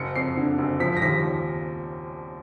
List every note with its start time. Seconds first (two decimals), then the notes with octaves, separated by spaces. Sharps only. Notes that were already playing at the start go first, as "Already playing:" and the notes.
Already playing: F#1 C#7
0.15 F2 C7
0.37 D3
0.58 F#1
0.80 F3 B6
0.97 A#6
1.02 D#2 B6